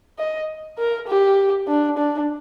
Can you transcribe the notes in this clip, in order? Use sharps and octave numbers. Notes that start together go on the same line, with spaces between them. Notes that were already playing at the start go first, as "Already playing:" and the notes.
D#5
A#4
G4
D4
D4